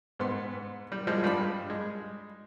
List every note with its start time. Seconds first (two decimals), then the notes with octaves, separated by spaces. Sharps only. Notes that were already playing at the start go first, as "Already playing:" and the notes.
0.19 G#2 B3 C6
0.92 G3
1.07 F3 G3 G#3
1.23 G2 G3 D4 F5 B5
1.70 G#3